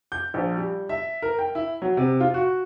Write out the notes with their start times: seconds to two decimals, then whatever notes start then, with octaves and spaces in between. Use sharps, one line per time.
0.12 G6
0.34 A#1
0.57 G3
0.89 E5
1.22 A#4
1.39 G5
1.55 E4
1.82 F#3
1.97 C3
2.20 F4
2.34 F#4